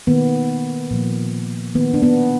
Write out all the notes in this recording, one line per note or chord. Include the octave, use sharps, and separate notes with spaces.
D#3 A#3 B3
A#2 F3 A#3
D#3 A#3 B3
D4
B3